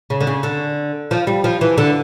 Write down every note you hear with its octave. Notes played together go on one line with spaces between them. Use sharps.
C#3
D3
C#3
D3
F3
G3
F3
E3
D3